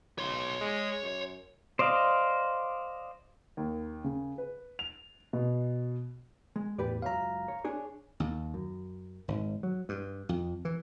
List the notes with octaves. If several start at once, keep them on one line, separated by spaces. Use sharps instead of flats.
B1 C#5 C6
G#3
F#2
C5 D5 D#5 F5
D#2
C#3
B4
F7
B2
G#3
E2 A2 G4 B4 D5
C#2 F#2 E5 F5 A#5
C#5
D4 G#4 C#5
D#2
F#2
G#1
F#3
G2
F2
E3